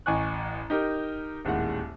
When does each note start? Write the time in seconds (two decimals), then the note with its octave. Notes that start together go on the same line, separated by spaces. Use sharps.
0.06 A1 D#5 G#5 C#6 D6 F#6
0.70 D#4 G4 A#4
1.45 D#1 D#2 A2 G#3 F#5